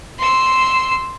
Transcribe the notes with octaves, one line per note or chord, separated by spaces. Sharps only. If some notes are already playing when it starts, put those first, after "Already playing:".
C6 E6